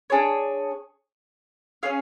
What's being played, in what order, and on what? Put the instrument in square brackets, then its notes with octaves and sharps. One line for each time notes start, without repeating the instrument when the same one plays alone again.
[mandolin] D4 G#4 C#5
C#4 G#4 C#5 F5